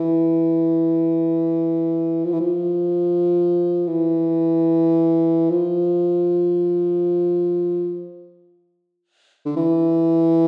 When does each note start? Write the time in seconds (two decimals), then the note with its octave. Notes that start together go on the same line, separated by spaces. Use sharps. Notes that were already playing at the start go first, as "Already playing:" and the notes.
Already playing: E3
2.25 F3
2.33 E3
2.41 F3
3.87 E3
5.50 F3
9.46 D3
9.56 E3